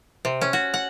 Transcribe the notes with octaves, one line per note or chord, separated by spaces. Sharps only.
C3
C#4
F#4
F#5